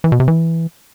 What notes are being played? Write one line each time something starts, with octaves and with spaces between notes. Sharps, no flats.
E3
B2
C3
E3